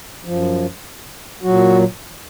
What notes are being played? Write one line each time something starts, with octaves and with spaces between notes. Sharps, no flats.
F#2 F3
A#2 F#3 F#4